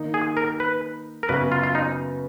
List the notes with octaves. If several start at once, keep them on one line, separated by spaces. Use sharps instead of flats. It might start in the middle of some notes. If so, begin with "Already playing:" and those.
Already playing: D#3 A#3 D#4
G#4
A#4
B4
A#4
F#2 C#3 F#3 B3 F#4 B4
F4
F4
D#4